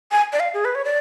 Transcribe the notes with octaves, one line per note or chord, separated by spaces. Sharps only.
G#5
D5
F5
G#4
B4
C#5
D5